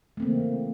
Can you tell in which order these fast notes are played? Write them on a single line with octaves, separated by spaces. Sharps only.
A3 C4 A#3 C#3 E3